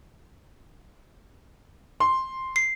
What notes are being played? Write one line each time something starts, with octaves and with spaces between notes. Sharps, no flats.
C6
C7